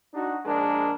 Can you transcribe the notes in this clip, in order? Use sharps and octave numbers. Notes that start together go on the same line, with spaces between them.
D4 D#4 F#4
A#1 G#3 D4 A#4